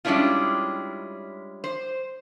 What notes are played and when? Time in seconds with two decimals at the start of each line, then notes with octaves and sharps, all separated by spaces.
0.05 G3 G#3 C#4 D4 E4 F4
1.64 C5